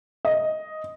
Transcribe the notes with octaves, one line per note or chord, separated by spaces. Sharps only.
D#5